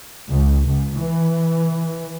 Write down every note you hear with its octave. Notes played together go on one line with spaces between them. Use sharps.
C#2
C#2
E3